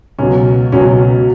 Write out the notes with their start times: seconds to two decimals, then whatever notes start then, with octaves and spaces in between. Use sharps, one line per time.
0.19 C#2 B2 F#3 C#4
0.72 C#2 B2 F#3 C#4